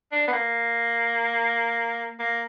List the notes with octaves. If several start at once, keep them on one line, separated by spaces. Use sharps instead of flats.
D4
B3
A#3
A#3